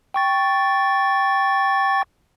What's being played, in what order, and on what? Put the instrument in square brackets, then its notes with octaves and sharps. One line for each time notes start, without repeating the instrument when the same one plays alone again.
[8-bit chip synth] G5 C#6 A6